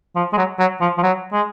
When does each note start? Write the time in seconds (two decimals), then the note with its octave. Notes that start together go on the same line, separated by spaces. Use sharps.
0.16 F3
0.33 G#3
0.37 F#3
0.59 F#3
0.81 F3
0.98 F3
1.03 F#3
1.32 G#3